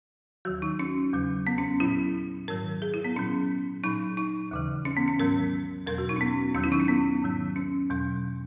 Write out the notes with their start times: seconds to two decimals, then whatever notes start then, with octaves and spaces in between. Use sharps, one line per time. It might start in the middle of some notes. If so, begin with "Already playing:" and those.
0.45 D#2 D#3 F#3 F#4
0.62 D#4
0.79 C#4
1.13 E2 C#3 F#3
1.47 B3
1.58 C#4
1.80 A#2 F#3 E4
2.48 G#2 D#3 F#3 A#4
2.82 G#4
2.94 E4
3.04 B3
3.16 A#2 F#3 C#4
3.84 A#2 F#3 D#4
4.17 D#4
4.51 D#2 C#3 E3
4.85 C#4
4.97 B3
5.08 C#4
5.19 G#2 D#3 F#3 A#4
5.86 E2 B2 F#3 A#4
5.98 F#4
6.09 D#4
6.16 C#4
6.21 B3
6.54 E2 D#3 F#3 C#4
6.64 E4
6.72 D#4
6.80 C#4
6.88 B3
7.22 G#2 D#3 F#3
7.56 C#4
7.90 E2 B2 F#3